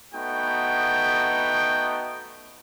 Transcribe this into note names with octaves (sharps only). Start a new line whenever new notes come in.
A3 B3 D#4 F#4 G5